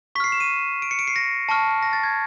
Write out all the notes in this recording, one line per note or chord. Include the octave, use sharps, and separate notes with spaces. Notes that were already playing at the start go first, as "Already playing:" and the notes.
C#6 F6 B6 C7
E7
D#7
D7
C#7
D7
C7
A#6
A5 C#6 F6
A#6
A6
G#6